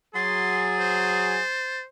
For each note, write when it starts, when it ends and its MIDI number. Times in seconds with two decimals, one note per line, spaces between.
0.15 1.39 54
0.15 1.39 68
0.15 0.63 84
0.15 1.80 93
0.79 1.85 72